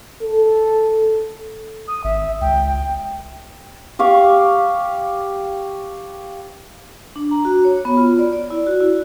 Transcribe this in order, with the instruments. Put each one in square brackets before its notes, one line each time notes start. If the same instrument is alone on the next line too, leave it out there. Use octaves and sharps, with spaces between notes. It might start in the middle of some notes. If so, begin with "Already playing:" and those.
[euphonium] A4
[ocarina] D#6
[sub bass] G#1 [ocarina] E5
[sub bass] C#2 [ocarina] G5
[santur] G4 F5 C#6 D6
[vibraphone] D4
A#5
F#4
C#5
B3
F4
D5
D5
E4
F#4
E4